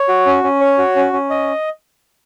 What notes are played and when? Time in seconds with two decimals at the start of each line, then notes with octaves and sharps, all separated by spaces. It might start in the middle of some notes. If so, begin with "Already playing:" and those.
Already playing: C#5
0.09 F#4
0.26 C#4
0.44 C#4
0.61 C#5
0.78 F#4
0.96 C#4
1.13 C#4
1.30 D#5